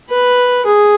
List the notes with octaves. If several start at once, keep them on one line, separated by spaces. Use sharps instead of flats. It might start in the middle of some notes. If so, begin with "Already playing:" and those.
B4
G#4